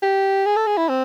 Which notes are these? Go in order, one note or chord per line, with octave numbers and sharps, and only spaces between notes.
G4
G#4
A4
G#4
E4
C4